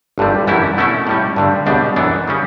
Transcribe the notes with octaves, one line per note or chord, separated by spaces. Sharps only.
G1 G2 D3 G3
F#2 E3 G3 C#4 E4
B2 A3 C#4 E4
A2 G3 C#4
G2 D3 G3
C#2 B2 G3 D4
F#2 E3 B3 D4
C#3 G3 C#4